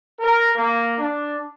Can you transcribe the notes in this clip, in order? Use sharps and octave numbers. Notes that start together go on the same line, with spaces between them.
A#4
A#3
D4